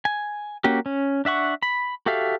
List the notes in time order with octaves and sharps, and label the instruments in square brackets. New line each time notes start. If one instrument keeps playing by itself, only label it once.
[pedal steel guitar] G#5
A#3 C#4 F#4 G4
C#4
D4 E5 F#5 C#6
B5
F#4 G4 A4 E5 F5